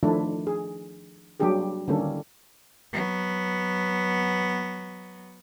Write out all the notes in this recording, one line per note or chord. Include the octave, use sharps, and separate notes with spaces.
D#3 F3 A3 D4 E4
G#4
F#3 G3 A#3 D4 G4 G#4
D3 D#3 G3 A#3 C#4 A4
F#3 B3